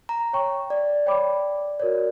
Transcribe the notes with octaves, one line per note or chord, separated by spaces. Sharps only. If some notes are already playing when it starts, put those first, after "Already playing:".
A#5
C#5 G5 C#6
D5
C#5 G5 B5 D6
F#4 A#4 C#5 D5